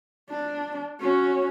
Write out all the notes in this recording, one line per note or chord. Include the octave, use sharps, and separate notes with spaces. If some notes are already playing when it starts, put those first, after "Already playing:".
D4
C#4 F#4